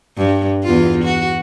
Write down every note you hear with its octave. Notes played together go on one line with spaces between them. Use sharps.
G2
E2 F4
F#4